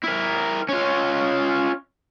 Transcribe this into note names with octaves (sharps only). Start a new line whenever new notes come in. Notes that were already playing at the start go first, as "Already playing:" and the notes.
E4 A#4
C#4 F4